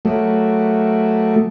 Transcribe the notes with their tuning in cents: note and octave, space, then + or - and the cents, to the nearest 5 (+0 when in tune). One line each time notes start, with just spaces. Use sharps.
F#3 +0 A3 +0